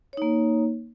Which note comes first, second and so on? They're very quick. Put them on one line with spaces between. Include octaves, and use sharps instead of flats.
C#5 D#4 A#3